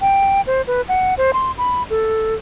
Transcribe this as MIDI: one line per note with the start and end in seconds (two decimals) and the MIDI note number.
0.01 0.41 79
0.47 0.62 72
0.67 0.81 71
0.88 1.14 78
1.18 1.31 72
1.33 1.52 84
1.58 1.83 83
1.90 2.35 69